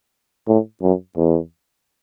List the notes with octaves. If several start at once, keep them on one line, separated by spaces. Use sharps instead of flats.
A2
F#2
E2